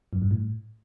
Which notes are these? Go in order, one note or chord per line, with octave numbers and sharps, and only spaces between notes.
F#2
G2
A2